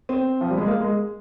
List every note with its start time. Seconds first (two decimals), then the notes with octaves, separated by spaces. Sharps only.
0.09 C4
0.41 F3
0.50 G3
0.58 G#3
0.67 A#3
0.81 G#3